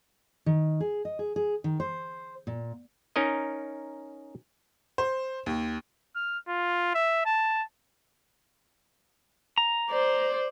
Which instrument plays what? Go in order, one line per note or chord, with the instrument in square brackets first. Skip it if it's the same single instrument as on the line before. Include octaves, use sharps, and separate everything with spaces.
[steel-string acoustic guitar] D#3
G#4
D#5
G#4
G#4
D#3
C5
A#2
[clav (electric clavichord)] C#4 D#4 A#4 D#5
[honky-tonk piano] C5
D#2
[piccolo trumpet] F6
F4
E5
A5
[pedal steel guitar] A#5
[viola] C5 D5